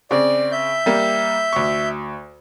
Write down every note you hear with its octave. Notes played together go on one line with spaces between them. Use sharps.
C#3 C4 D5
E5 G6
G3 A#3
D2 C#6